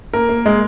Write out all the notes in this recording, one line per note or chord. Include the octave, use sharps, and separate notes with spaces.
A#3 A#4
A#3
G#3